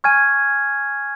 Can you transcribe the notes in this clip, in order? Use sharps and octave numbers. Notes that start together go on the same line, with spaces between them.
G#5 C#6 F6 G#6 D#7